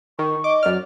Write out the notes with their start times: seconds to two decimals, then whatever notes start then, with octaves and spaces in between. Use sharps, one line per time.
0.19 D#3 C#6
0.44 D#5 D6
0.63 F#2 D5 F6